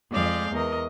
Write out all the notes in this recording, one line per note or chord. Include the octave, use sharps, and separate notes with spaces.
F2 G#3 D5 D#5 F5 G6
E2 A#4 D#5